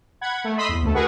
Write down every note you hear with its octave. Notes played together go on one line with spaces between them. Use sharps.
F#5 B5 G#6
A3
D#5 B5 C6 D#6 E6 B6
E2
D2 A3 A4
F#4 G#4 A#4 B4 F#5 C#6